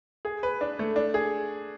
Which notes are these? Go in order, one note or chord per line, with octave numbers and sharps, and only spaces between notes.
G#4
B4
D4
A3
D4
G#4